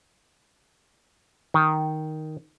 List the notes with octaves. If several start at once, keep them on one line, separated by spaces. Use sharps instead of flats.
D#3